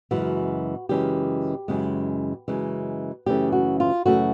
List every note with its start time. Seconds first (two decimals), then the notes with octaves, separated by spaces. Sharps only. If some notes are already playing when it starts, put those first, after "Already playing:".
0.11 F#2 C#3 E3 G#3 F#4
0.89 F#2 C#3 E3 G#3 G4
1.68 F#2 C#3 E3 G#3
2.48 F#2 C#3 E3 G#3
3.26 F#2 C#3 E3 A3 C#4 G4
3.52 F#4
3.80 F4
4.05 F#2 C#3 E3 A3 C#4 F#4